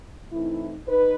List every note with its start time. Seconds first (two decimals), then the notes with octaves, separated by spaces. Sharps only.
0.31 E3 A3 C4 D#4 E4
0.86 D#4 B4